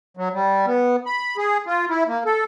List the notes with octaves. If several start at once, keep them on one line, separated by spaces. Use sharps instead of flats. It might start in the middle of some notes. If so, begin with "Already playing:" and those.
F#3
G3
B3
B5
G#4
F4
E4
A#3
A4